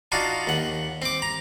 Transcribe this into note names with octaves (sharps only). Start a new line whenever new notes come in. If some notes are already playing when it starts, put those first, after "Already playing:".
D4 D#4 F4 F#4
D#2 F#5
C4 D6
A#5